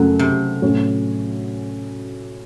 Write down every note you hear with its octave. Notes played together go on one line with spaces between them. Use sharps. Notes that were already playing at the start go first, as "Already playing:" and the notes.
Already playing: F#2 C#3 F#3 A3
C3
A2 F#3 C#4 F#4